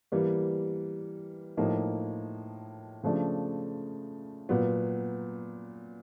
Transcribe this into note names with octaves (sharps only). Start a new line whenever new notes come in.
E3 G3 A#3
A2 F3 A#3 D#4
C#3 F3 A3 D4
A#2 F#3 B3